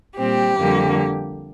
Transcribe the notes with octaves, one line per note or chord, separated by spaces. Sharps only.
A#2 G3 C4 G4
F2 D3 G3 A#3